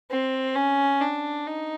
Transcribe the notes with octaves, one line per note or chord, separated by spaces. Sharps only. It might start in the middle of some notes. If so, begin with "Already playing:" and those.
C4
C#4
D4
D#4